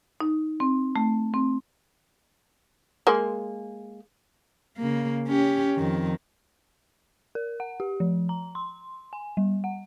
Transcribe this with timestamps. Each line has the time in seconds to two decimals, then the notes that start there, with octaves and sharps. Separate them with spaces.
0.20 D#4
0.60 C4
0.96 A3
1.34 C4
3.07 G#3 A#3
4.78 C#3 A#3
5.28 C#4 G4
5.76 F2 D#3
7.35 A#4
7.60 F#5
7.80 G4
8.00 F3
8.29 A#5
8.55 C6
9.13 G#5
9.37 G3
9.64 F#5